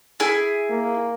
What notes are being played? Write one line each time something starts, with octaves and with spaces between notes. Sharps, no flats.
E4 G#4
A#3